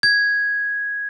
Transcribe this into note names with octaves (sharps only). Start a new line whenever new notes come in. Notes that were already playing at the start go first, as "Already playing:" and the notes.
G#6